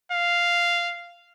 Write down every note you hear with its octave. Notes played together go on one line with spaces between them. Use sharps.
F5